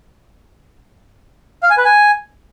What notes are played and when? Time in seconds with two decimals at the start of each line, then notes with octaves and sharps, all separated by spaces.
1.63 F5
1.70 G#5
1.77 B4
1.85 G#5